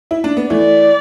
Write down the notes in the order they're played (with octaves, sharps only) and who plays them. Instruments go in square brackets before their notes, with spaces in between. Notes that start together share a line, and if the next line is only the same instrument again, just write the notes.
[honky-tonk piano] E4
D4
B3
[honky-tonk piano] E3 A3 [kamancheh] D5